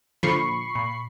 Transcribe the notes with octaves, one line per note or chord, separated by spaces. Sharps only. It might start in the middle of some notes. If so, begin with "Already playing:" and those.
A#2 D3 F3 B5 C#6 C7
A#2